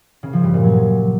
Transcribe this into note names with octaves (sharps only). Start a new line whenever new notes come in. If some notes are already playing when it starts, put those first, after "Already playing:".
C#3
F3
G2
A#2
F#3